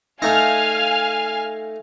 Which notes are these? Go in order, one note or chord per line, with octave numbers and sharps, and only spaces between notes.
A3 D#4 F5 G#5 F6